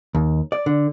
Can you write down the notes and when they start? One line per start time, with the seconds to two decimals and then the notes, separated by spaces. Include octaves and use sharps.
0.15 D#2
0.52 D5
0.66 D3